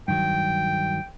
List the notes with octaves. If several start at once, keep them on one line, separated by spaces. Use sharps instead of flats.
G2 D#3 F#3 G5